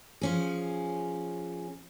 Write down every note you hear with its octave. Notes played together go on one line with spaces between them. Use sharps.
F3 C#4 G#4